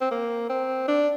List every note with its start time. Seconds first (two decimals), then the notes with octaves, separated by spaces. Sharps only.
0.01 C4
0.11 A#3
0.49 C4
0.88 D4